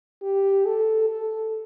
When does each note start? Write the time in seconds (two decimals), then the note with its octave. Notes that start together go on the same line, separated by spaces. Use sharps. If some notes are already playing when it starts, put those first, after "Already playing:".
0.22 G4
0.65 A4
1.09 A4